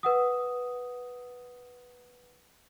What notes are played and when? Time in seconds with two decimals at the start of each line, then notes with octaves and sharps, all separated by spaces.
0.03 B4 F#5 D#6